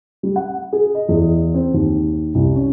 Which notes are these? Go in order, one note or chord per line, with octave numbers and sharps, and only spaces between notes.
G3
F#5
G#4
D#5
E2
C4
D#2
C2
C#4